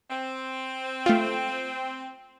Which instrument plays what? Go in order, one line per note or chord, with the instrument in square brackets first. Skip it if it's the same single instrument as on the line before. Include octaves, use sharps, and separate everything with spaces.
[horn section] C4
[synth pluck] A3 F4